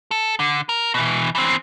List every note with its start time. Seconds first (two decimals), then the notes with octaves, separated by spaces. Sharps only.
0.11 A4
0.39 D3
0.69 A#4
0.94 B2 E3
1.35 E3 C4